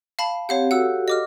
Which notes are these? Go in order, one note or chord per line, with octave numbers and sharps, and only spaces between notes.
F5 A5 B5
C4 G4 C#5 F5 F#5
F#4 G4 A4 F#5 E6
D#5 D6 F6